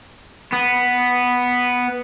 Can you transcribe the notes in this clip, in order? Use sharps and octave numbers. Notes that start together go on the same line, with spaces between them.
B3